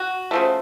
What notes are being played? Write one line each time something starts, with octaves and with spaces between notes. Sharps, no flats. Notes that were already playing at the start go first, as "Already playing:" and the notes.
Already playing: F#4
C#3 F3 A3